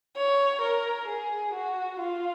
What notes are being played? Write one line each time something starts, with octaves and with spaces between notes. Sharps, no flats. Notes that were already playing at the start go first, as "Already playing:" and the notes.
C#5
A#4
G#4
F#4
F4